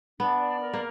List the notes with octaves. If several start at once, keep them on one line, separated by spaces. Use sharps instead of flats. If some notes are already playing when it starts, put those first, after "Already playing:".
B3 D4
D5
A#4
A#3